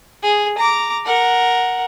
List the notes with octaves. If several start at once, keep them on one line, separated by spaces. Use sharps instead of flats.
G#4
A#5 D6
A#4 F#5